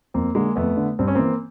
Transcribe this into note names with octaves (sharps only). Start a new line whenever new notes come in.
F2 A#3 C4
D3 G#3 A#3
F2 A3 B3
D3
G2 C4
C#4
E3 A#3 C4